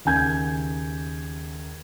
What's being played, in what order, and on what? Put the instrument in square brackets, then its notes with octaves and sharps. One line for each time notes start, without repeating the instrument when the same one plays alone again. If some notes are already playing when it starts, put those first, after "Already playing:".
[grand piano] D#2 C#3 G#5 G6 G#6